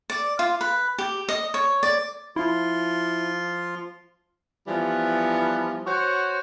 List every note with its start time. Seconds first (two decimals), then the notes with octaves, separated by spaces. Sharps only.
0.10 D5
0.39 F4
0.61 B4
0.98 G4
1.29 D#5
1.54 C#5
1.83 D5
2.36 F3 E4 F4 C6
4.68 E3 F3 G3 B3
5.87 F#4 C5 C#5 F#5